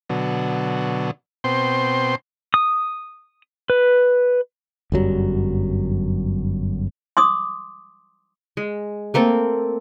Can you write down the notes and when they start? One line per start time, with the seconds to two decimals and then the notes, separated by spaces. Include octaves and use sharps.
0.10 B2 D3 F#3
1.44 B2 C4 C5 G5 C6
2.54 D#6
3.70 B4
4.92 G1 F#2 F#3 G3
7.17 C6 D6 D#6
8.57 G#3
9.14 A3 A#3 C4 A4